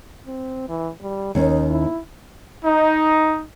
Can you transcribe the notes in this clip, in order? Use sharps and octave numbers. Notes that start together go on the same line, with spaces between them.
C4
E3
G3
D#2 C#4 D#4
E4
D#4